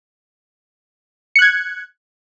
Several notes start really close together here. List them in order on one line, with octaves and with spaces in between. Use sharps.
C#7 F#6 G#6